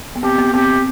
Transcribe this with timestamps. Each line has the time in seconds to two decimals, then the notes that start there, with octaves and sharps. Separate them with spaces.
0.15 B3
0.23 C4 G4
0.38 B3
0.54 C4 G4